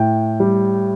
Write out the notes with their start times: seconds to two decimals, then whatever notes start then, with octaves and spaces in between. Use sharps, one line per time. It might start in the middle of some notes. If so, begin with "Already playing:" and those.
Already playing: A2 G5
0.40 G3